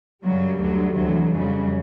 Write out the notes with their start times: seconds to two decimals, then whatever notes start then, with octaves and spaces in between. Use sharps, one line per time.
0.24 F#2 C#3 F#3 G3
0.59 D2 D3 F#3
0.95 D2 C3 E3 F#3
1.31 F2 C#3 F#3 G3